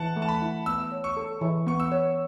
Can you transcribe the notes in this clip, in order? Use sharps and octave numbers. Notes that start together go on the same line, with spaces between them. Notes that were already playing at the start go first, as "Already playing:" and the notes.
Already playing: E3 F#5 A5
A3
A5
B5
E4
B3 E6
C#5
C#6
A4
E3
B3 C#6
E6
C#5